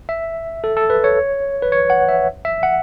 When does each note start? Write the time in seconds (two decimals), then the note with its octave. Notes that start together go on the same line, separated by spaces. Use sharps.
0.09 E5
0.64 A4
0.77 A4
0.90 B4
1.04 C#5
1.62 B4
1.72 C#5
1.90 F#5
2.09 E5
2.45 E5
2.63 F#5